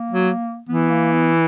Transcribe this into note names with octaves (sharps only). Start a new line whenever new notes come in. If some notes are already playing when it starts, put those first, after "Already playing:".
Already playing: A#3
F#3
E3 B3
A#3
B3